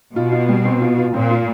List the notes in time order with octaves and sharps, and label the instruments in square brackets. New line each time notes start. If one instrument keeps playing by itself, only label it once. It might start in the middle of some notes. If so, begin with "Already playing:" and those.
[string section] B2 [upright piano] F4
[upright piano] F4
G3
C4
F4
F4
[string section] A#2 [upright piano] C4
[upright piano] F4